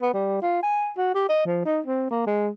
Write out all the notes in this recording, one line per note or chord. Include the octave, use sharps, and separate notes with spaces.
B3
G3
F4
G#5
F#4
G4
D#5
F3
D#4
C4
A#3
G#3